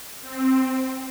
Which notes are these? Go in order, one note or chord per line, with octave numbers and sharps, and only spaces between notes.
C4